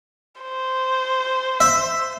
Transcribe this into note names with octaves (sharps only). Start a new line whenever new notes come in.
C5
E5